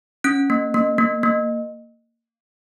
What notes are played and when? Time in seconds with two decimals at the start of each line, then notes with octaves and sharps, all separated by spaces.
0.24 C#4 F#6
0.50 A#3
0.74 A#3
0.98 A#3
1.23 A#3